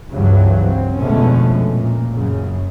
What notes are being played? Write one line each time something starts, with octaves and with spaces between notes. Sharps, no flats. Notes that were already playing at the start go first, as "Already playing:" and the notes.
C#2 G2 C#3 E3 F#3 C4
C4
F2 B2 D3 G#3 A3 C#4
A#2
F#2 C#3